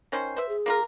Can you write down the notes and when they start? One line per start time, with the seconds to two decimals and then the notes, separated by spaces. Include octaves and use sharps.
0.12 D#3 C#4 C5
0.37 B4 C5 E5
0.49 G#4
0.66 A#3 F4 A#4